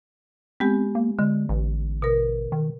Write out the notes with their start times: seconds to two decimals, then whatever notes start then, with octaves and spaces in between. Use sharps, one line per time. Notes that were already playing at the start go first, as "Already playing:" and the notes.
0.60 G#3 B3 C4 G4
0.95 A#3
1.19 D3 G#3
1.49 A1
2.02 B2 A#4
2.52 D#3